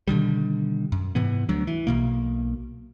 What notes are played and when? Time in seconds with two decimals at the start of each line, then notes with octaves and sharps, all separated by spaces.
0.08 B2 D3 D#3 G3
0.92 F#2
1.15 G#2 C3 E3 B3
1.49 D2 F#3 D4
1.67 E3
1.87 B1 B2 A#3